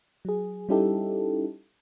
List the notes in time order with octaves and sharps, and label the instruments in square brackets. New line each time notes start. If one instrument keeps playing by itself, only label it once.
[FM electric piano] F#3 G#4
G3 C#4 D#4 E4 G4 A4